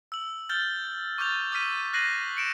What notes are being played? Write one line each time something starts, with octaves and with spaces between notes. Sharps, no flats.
E6 F#7
F6 G6 A6 G7
C#6 D6 F6 G6 A6 F7
D6 E6 F6 B6 D#7
F#6 A#6 C7 D#7 F#7
C#7 D7 E7